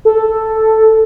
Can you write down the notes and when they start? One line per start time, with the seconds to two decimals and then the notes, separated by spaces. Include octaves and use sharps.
0.05 A4